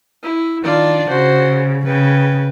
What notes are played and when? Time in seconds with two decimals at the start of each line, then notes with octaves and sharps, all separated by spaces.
0.23 E4
0.64 D#3 D4 F4 D5
1.09 C#3 F#4 C5
1.86 C#3 B4 G5